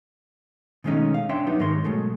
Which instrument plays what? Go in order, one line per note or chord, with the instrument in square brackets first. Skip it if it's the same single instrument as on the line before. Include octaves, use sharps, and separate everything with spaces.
[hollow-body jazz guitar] B2 D#3 G#3 A3 C#4 D#4
F5
C4 D4 C#5 E5 G5 C6
F#3 B3 D#4 G4
G#2 D#3 A#4 C#5 C6
B2 F#3 G#3 A3